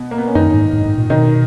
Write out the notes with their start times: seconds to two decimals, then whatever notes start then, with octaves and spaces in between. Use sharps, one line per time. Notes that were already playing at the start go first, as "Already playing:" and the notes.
Already playing: B2 B3
0.11 A#3
0.18 B3
0.27 C#4
0.35 F#2 D#3 D#4
0.54 G#2
0.73 G#2
0.85 G#2
0.98 A#2
1.10 B2 D#3 D#4